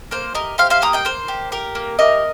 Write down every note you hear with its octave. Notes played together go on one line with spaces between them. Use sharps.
A#3 C5
G4 A#4 D#5
G4 C5 F5
C5 F5
A#3 A#5 D#6
D#5 G5
A#3 C5
G4
G4 A#4
A#3
G4 A#4 D#5